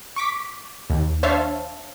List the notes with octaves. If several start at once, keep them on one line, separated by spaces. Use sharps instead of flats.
C#6 D6 B6
D#2
D4 C5 C#5 E5 F5 A5